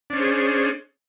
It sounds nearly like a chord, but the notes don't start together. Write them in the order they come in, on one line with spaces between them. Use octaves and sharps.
D4 C#4 C5 G#4